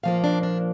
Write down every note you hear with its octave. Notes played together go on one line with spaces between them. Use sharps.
A#2 F3 A#3 F5
D4
D4